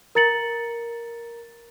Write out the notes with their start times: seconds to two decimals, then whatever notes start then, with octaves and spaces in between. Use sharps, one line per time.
0.15 A#4 A#5 A6 C#7 F#7